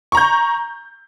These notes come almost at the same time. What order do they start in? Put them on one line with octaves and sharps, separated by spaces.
C#6 A#5 G6